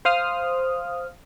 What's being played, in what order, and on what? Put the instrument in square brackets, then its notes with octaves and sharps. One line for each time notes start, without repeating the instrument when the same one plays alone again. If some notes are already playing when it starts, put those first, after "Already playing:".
[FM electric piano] C5 F5 D#6 F6